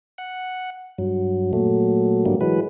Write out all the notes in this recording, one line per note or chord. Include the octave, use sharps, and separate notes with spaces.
F#5
G2 F#3
A#2 F#3 A3
G#2 D3 F#3 G3 A#3
E3 F#3 G#3 B4